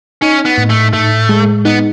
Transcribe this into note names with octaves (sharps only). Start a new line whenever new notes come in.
C#4 D#4
B3
A2
A3
A2 A3
G#3
B3 D#4